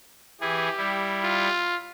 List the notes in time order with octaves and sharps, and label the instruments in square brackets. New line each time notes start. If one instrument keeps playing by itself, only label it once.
[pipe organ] E3 E4 G#4 [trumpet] G4
[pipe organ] G3 E4
[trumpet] F4